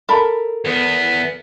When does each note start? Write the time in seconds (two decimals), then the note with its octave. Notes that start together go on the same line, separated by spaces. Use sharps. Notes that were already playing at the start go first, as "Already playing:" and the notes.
0.09 A4 A#4 B5
0.65 E2 B3